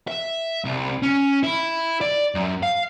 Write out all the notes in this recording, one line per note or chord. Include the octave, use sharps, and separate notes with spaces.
E5
C2
C#4
E4
D5
F#2
F5